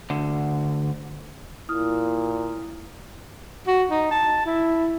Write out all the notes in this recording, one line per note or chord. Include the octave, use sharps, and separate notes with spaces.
D2 D3
A#2 E4 D#6 F6
F#4
D#4
A5
E4